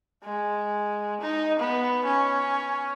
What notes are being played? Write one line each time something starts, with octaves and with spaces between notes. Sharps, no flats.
G#3
D#4
B3
C#4